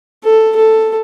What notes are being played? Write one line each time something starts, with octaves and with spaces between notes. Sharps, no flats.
A4
A4